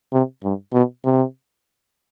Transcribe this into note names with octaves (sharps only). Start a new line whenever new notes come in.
C3
G2
B2
C3